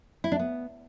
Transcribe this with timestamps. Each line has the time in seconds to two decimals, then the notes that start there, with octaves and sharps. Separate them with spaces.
0.24 E4
0.32 D4
0.39 B3